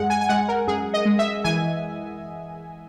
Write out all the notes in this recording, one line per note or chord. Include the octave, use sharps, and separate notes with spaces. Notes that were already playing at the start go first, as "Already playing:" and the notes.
Already playing: F#2 G#3 F#5
G#5
G#5
G#3 F#5
A#4
F#2 G#4
D#5
G#3
E5
E3 G#5